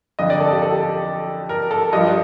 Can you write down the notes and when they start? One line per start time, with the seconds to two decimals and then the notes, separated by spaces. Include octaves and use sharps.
0.19 F2 D3 F3 D#5
0.30 D5
0.40 A4
0.51 G4
0.62 A4
1.49 A#4
1.71 A4
1.93 G2 F3 D#5